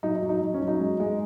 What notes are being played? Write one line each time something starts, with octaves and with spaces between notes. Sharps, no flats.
F#3 D#4
D#4
F#3
D#4
F#3
C#4
F#3
D#4
G#3
G#3